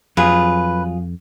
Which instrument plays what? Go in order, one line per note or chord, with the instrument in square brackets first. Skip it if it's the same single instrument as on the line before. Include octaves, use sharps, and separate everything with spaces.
[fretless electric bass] F2 [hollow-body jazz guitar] F#3 F4 G#4 [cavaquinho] B4